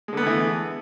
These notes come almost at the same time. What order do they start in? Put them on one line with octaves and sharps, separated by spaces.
G#3 D3 B3 A3 E3